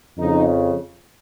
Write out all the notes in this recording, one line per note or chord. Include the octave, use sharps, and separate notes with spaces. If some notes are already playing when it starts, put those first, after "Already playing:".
F2 C#3 F3 D#4